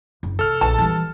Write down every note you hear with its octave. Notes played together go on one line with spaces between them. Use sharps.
F#1
C3 A4 F6
A#1 A5
E3 G3